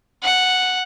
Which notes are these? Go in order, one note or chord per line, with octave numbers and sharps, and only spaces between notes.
F#5